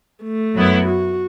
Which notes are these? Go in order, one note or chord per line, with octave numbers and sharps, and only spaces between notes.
A3
F#2 F#3 B3 E4
F#4